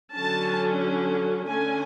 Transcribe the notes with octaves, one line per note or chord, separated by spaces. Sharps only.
D3 F#3 C#4 A5
D3 A3 C#4 G#5